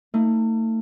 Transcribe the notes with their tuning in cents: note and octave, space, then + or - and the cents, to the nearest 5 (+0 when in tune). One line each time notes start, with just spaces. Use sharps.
A3 +35 D#4 +40